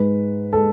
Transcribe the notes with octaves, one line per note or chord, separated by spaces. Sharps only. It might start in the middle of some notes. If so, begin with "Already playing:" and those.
Already playing: G#2 G#3 B4
G#3 A4